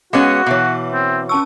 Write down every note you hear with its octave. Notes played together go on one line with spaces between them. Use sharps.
G#3 B3 C#4 F#4 F5 D6 C#7
B2 E3 C#5 E5 D6
C4
C#4 A5 C#6 E6